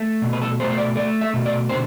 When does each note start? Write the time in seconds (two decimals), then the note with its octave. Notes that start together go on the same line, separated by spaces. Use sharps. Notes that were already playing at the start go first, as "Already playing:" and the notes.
Already playing: A3
0.22 B2
0.33 B4
0.41 A4
0.60 A3 C5
0.71 C5
0.78 D5
0.96 A3 D5
1.21 E5
1.34 B2
1.46 D5
1.69 D3 C5